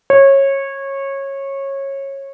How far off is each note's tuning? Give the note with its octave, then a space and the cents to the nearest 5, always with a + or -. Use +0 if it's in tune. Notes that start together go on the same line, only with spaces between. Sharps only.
C#5 -20